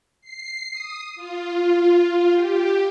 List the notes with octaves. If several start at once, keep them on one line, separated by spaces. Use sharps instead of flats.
C7
D#6
F4
G4